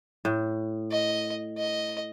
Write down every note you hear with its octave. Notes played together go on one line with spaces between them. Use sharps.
A2
D#5
D#5